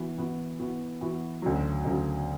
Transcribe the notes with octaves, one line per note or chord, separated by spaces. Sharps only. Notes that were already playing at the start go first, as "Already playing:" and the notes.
Already playing: E3 B3 F#4
E3 B3 F#4
E3 B3 F#4
E3 B3 F#4
D2 C#3 F#3
D2 C#3 F#3